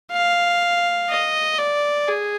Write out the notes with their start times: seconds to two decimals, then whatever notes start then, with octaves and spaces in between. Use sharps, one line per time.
0.12 F5
1.10 D#5
1.58 D5
2.08 G#4